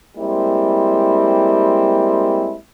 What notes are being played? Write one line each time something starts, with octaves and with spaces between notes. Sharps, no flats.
G3 G#3 A#3 C4 E4